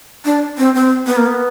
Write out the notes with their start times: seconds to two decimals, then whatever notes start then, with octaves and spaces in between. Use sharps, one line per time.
0.25 D4
0.58 C4
0.75 C4
1.07 B3
1.17 A#3
1.27 B3